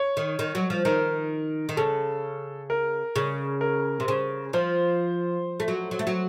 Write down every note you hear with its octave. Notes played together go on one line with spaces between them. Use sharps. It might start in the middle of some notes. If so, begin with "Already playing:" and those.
Already playing: C#5
D#3
D#3
F#3
F3
D#3 A#4
D#3
C#3 A4
A#4
C#3
A#4
C3
C#3
F3 C5
A3
F#3
F#3
A3
F#3